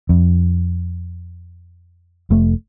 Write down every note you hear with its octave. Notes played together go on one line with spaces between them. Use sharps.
F2
F1 A3